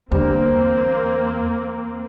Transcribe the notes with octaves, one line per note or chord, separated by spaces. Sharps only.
E2 D3 G3 A#3 C4 C5